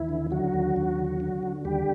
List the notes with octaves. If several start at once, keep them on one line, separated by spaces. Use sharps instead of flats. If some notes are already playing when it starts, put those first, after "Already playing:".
Already playing: D#2 E3 E4
D3
D3 F#3 F#4
D#2
D#2
D3
D3
D3
D#2 G3 G4